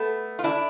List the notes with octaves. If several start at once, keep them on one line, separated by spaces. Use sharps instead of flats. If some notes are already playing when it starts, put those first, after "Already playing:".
Already playing: A3 B3
F4
D4 E4